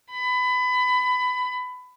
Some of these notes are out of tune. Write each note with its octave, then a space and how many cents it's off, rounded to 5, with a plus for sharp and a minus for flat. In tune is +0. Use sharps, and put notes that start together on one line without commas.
B5 +25